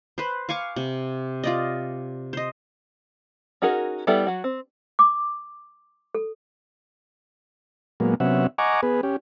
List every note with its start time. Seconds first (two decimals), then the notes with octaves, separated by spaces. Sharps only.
0.18 B4 C5
0.49 F5 G#5 C#6 D6
0.76 C3
1.43 F4 D5 D#5
2.33 C5 D#5
3.62 C#4 D#4 F#4 G#4 A#4
4.07 G3 B3 E4 A4 D5
4.27 F#3 F#4
4.44 C4
4.99 D6
6.15 A4
8.00 A#2 F#3 G#3 A#3 B3
8.20 C3 F#3 B3 C#4 E5 F#5
8.58 D#5 F#5 G#5 A#5 C#6 D6
8.83 B3 G#4 B4
9.03 C#4 G4